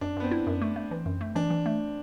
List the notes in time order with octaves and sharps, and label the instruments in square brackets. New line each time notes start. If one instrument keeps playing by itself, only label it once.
[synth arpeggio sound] F#2 [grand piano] D4
[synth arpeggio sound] F#2 [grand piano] B3
[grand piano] C4
[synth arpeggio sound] E4
F#2
A3
A3
E3
F#2
A3
[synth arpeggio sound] E3 [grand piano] D4
[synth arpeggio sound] E3
A3